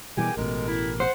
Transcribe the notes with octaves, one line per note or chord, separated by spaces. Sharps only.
B2 E3 G3 G#3 A#3 G4 G#5
A1 B2 G#3 G4 A4 A#4
E4
C5 F#5